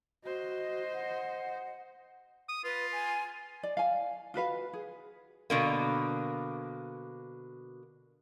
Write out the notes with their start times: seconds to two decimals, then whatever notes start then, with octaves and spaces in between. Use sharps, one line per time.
0.24 F#4 C5 D#5
0.94 F#5
2.49 D#6
2.64 F4 B4
2.92 G#5
3.63 D5
3.77 F5 G#5
4.34 F4 F#4 B4 F5
4.73 G#4
5.50 B2 D3 A#3